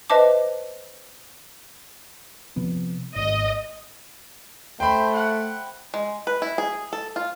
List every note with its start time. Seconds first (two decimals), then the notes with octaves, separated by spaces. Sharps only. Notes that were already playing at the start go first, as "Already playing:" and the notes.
0.10 B4 C5 D#5 E5 A5 D6
2.56 C3 F3 B3
3.16 G#1 D#5
4.80 A3 C5 G5 B5
5.14 F#5
5.94 G#3
6.27 B4
6.42 E4
6.58 G#4
6.93 A4
7.16 F4